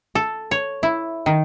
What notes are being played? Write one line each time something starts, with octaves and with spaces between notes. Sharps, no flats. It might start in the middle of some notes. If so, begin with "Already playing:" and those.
A4
C#5
E4
D#3